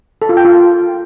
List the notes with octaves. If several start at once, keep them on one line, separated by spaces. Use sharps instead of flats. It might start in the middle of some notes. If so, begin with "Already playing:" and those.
A4
F4
G5
F4